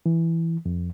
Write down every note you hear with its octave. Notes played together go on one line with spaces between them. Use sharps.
E3
F2